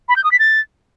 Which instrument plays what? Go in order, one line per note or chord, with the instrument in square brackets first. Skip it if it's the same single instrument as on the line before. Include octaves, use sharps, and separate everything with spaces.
[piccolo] B5
G6
D#6
B6
A6